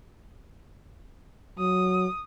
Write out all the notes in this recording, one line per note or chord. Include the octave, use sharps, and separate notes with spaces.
F#3 D#6